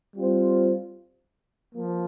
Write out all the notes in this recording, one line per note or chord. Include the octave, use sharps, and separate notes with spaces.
G3 C4 F4 C5
F3 A#3